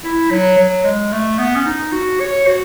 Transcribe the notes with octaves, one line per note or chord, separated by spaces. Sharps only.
E4
F#3
F#3
G#3
A3
B3
C#4
D#4
F#4
C#5
F#4